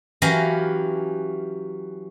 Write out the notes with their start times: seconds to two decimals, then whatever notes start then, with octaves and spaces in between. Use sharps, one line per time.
0.22 E3 F#3 C#4 G4 F5 A#5